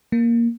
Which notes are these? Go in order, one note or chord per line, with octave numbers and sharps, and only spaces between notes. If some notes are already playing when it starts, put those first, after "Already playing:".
A#3